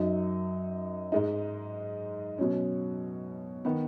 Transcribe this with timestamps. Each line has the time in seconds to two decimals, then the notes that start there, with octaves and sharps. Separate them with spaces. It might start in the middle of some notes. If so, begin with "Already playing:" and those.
Already playing: F#2 F#3 D#4
1.12 G#2 G#3 D#4
2.38 B2 F#3 C#4
3.65 D#3 B3